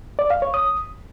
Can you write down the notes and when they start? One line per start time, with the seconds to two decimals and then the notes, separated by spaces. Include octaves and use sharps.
0.19 D5
0.30 F5
0.42 C#5
0.54 D#6